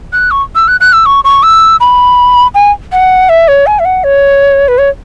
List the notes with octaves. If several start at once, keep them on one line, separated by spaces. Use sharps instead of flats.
F#6
C#6
E6
F#6
F#6
E6
C#6
C#6
E6
B5
G#5
F#5
E5
C#5
G#5
E5
F#5
C#5
B4
C#5